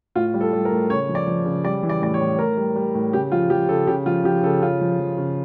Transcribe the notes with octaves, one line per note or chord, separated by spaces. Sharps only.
A2 F4
G3
A4
G3
A#4
A2
C#3 C#5
F3
D5
F3
C#3
G3 D5
E3
D5
A2 D5
C#5
A2
A2 A#4
G3
G3
A2
C#3 G4
F3 F4
F3 G4
C#3 A4
C#3 G4
F3 F4
F3 G4
C#3 A4
C#3 F4
F3
F3
C#3